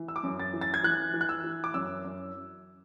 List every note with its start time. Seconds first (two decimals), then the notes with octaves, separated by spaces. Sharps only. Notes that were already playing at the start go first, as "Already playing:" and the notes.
Already playing: E3
0.08 E6
0.16 D6
0.23 F#2
0.39 A6
0.53 E3
0.61 A6
0.74 G#6
0.83 E3 F#6
1.14 E3
1.21 F#6
1.29 E6
1.44 E3
1.64 D6
1.74 F#2 E6
2.05 F#2